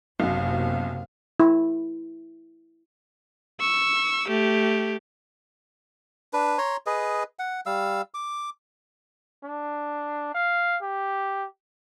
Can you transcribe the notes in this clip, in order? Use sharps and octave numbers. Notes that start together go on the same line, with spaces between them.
F#1 B1 F#2 C3 F5
E4
C#6 E6
A3 G4
D4 B4
C#5 A#5 C6
G#4 B4 D#5
F#5
G3 F5 E6
D6
D4
F5
G4